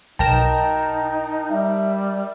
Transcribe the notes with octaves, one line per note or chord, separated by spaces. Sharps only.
B1 D#4 A#4 G5 A5 A#6 E7
G3 E5